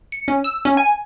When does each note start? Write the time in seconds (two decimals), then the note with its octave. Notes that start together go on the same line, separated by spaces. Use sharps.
0.12 C#7
0.28 C#4
0.44 E6
0.65 C#4
0.77 G#5